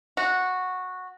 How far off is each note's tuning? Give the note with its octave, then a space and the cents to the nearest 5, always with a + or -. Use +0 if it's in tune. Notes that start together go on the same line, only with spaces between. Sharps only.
F#4 -10